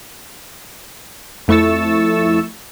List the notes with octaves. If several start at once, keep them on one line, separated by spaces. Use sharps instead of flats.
F2 A3 E4 C#6 E6 A6